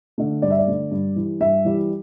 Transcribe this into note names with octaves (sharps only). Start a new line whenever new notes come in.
D3 A3
G2 D5
E5
D5
D3 A3
G2
E3 G3
G2 E5
E3 G3